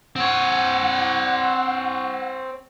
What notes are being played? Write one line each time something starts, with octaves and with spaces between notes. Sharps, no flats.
C4 C#5 F#5